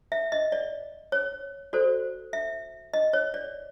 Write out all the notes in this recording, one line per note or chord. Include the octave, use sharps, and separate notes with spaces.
E5
D#5
D5
C#5
F#4 A4 C5 D5
E5
D#5
C#5
D5